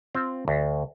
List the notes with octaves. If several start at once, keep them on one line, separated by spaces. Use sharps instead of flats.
C4 F4
D2